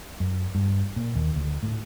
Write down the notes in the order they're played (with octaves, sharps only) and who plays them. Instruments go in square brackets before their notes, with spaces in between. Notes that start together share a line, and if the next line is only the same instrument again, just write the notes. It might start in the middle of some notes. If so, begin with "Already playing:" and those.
[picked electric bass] F#2
G2
A#2
D#2
D2
A2